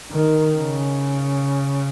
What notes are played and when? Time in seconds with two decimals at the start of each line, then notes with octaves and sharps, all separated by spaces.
0.11 D#3
0.56 C#3